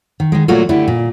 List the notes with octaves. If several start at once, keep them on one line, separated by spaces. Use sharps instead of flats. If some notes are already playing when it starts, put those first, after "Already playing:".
D#3
D#3 G#3
A#2 F#3 A3 A#3 F4 F#4
D3 A3 E4 G4
A#2